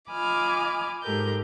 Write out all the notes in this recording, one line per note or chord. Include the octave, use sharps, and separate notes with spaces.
F4 D#5 G#5 B5 D6 F6
G#2 G#3 G4 A4 A#4 G6